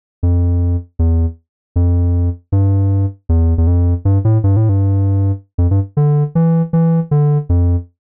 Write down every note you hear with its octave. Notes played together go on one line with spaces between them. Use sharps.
F2
E2
F2
G2
E2
E2
F2
G2
A2
G2
A2
G2
F2
G2
D3
E3
E3
D3
F2